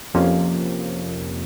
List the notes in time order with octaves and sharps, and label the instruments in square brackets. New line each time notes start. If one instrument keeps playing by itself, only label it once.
[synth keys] F2 C3 F3 A#3 C#4